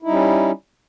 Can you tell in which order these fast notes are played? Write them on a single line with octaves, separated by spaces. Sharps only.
E4 D#4 G3 C#4